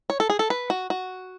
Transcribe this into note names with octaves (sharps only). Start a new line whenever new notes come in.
C#5
A4
G#4
A4
B4
F#4
F#4